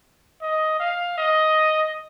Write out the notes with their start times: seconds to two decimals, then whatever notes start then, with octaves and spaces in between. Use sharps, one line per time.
0.41 D#5
0.80 F5
1.18 D#5